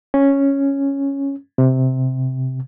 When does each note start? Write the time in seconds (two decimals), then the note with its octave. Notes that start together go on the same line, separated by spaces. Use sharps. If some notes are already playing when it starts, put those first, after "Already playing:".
0.14 C#4
1.58 C3